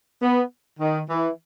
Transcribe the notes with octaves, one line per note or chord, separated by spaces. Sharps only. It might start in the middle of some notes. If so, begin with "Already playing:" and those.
B3
D#3
E3